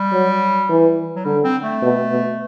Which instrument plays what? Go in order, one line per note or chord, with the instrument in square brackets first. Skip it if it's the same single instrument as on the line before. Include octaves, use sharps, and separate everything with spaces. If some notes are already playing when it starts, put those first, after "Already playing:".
Already playing: [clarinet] G3
[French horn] F#3
E3
[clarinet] F#3
[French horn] D3 [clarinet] G3
[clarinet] C4
A3
[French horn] B2
B2